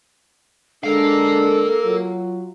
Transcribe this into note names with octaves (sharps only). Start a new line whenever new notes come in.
D3 G#3 D4 A4 A#4 F5
F#3 F4